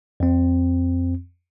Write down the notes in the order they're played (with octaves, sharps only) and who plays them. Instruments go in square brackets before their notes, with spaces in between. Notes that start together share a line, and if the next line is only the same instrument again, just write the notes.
[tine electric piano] F2 C4